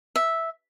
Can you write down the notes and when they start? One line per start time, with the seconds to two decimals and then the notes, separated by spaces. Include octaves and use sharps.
0.16 E5